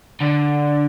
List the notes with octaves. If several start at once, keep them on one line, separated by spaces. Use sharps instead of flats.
D3